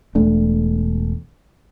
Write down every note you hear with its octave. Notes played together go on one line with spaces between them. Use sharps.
E1 A3 D4